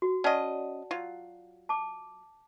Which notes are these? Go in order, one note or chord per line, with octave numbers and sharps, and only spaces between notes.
F#4
C#4 D5 D#5 F#5 A5
F#3 F4
A5 D6